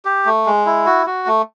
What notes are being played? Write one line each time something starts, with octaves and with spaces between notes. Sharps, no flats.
G4
A3
G#3
E4
F#4
F#4
A3